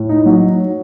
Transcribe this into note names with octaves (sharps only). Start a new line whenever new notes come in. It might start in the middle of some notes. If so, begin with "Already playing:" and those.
Already playing: A2
D#4
F#3